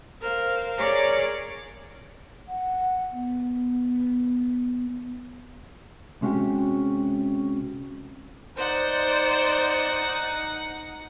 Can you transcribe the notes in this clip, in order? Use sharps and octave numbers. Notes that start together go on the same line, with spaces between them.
A#4 C5 F5
G#4 A#4 C#5 D5 D6 F6
F#5
B3
C3 G#3 C#4 F#4 G4
D#4 C5 D5 F#5